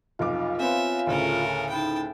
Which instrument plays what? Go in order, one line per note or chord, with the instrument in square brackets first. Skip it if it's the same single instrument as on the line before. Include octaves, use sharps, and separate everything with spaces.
[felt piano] F1 B1 D6 [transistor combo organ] F4
[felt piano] B3 C4 [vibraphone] C#5 F5 G#5 [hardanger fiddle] E5
[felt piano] D2 A2 C#3 [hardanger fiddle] A3 A#4
[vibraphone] D#4 B5 [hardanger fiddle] G5 A5